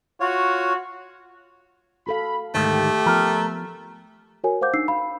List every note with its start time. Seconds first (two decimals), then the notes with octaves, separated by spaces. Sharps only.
0.21 F4 F#4 C#5
2.07 F#4 A4 F5 B5
2.55 D2 G#2 D#3 A3 G4
3.06 F3 B3 A#4
4.44 F#4 A#4 C#5 G#5
4.61 C5 F5 F#5 D6 G6
4.74 D4 D#4 E6 C7
4.88 F5 B5